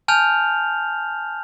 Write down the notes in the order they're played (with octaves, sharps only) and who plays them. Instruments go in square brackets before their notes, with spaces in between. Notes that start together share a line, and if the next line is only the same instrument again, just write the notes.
[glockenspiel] G#5 A5 F6 G6 F7